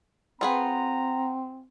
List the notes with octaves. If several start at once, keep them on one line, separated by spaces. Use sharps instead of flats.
C4 F4 G#4 B4 F#5 G5 A#5